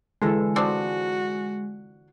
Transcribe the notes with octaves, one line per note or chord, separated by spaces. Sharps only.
D3 E3 G#3 A4
F3 C4 D4 F#4